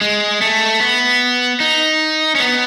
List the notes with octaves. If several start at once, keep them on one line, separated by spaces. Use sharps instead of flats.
G#3
A3
B3
D#4
C#4
B3